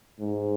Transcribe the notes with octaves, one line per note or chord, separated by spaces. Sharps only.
G#2